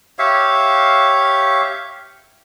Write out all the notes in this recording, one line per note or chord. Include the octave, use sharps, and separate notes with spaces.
G4 C#5 E5 F5